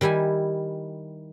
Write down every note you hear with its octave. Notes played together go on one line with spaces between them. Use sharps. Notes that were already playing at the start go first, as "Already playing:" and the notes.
D#3 G3 E4 E5 G#5